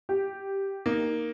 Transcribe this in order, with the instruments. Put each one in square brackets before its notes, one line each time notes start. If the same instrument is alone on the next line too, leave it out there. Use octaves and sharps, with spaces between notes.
[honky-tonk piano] G4
[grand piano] A#3 D#4